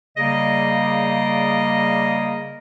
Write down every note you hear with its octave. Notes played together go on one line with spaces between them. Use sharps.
C#3 G3 A#3 G#4 D5 D#5